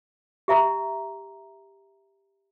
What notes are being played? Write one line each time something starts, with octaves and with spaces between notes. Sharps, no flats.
G4 E5 A#5